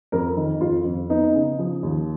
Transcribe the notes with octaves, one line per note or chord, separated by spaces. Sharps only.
F2 A#4
D#3
F2 F4
F2
B3 D#4
C#3
F3
D#2